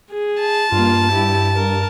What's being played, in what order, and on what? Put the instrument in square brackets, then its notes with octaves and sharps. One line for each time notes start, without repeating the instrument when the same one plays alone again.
[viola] G#4
[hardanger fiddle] A5
[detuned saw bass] G2 [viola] A#3 F4
[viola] E4 G4
A#4